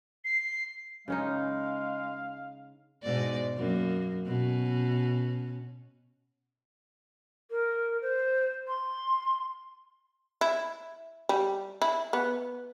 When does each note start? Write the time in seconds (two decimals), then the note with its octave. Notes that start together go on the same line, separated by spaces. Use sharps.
0.24 C7
1.08 C#3 G#3 C#4 D#4 F5
3.03 G#2 B2 D5
3.57 F#2 A#3
4.26 B2 C#4
7.51 A#4
8.02 C5
8.67 C6
10.41 E4
11.29 G3
11.82 E4
12.13 B3